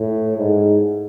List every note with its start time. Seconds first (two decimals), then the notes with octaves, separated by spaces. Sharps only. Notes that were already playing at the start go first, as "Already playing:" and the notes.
Already playing: A2
0.37 G#2